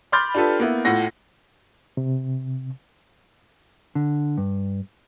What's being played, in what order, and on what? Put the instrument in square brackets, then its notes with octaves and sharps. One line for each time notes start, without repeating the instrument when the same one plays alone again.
[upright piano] B5 C6 D6 F6 G6 A6
D4 F4 G4 A4 B4
A#3 B3 E4
A2 F4 F#5 A#6
[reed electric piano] C3
[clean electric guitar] D3
G2